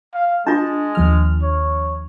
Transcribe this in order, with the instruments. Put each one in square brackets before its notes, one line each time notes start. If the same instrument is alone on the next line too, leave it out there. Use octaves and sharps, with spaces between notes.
[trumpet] F5
[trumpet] G#3 [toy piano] D4 F4 [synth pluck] A5
[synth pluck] D#2 F3 F6
[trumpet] C#5